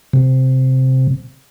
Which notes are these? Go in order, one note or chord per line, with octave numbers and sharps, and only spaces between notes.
C3